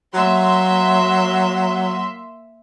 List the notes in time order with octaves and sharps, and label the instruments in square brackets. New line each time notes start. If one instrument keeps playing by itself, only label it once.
[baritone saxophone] F#3 [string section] A#3 E5 C6